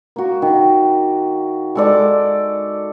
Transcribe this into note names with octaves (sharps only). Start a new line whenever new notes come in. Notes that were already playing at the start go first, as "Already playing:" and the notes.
A#3 F#4
D#3
G#3 A4 D5